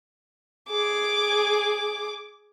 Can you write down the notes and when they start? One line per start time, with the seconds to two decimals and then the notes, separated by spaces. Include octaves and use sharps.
0.70 G#4 D6